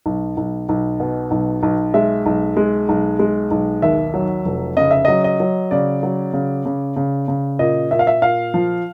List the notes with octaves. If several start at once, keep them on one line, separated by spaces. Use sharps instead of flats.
B1
B1
B1
B2
B1
B1
G#3 E5
B1
G#3
B1
G#3
B1
D#2 E5
F#3
F1
C#3 D#5
E5
F#3 D#5
D#5
F#3
C#3 D5
F#3
C#3
C#3
C#3
C#3
A#2 D#5
A#2 E5
F5
E5
A#2 F5
F3